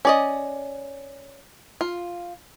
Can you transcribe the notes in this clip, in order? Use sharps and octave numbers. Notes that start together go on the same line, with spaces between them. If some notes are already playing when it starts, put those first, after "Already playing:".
C#4 D5 D#5
F4